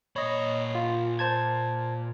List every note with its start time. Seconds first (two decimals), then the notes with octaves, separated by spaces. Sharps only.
0.16 A#2 C#5 D#5 B5
0.75 F4
1.19 C5 A5 G#6